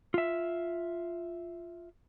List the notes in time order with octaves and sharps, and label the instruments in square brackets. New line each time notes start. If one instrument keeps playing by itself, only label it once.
[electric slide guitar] F4 E5